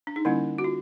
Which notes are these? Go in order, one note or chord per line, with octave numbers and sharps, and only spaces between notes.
D4
D#4
D3 G3 A#3 C#4 E4
F#4
F4